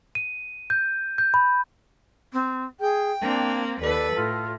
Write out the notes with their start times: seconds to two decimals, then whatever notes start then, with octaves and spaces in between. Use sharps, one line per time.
0.15 D#7
0.70 G6
1.18 G6
1.34 B5
2.33 C4
2.80 G#4 G5
3.21 A#3 C4 D4
3.81 D#2 A4 B4 D5
4.15 A2 F4